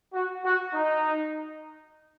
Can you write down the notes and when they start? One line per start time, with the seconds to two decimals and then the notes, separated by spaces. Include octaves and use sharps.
0.13 F#4
0.43 F#4
0.74 D#4